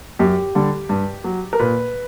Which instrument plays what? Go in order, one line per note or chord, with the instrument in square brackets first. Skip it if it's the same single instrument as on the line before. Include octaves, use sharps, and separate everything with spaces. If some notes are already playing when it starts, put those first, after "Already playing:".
[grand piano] F#2 G4
D3 G3
G2
F#3
A#4
A#2 B4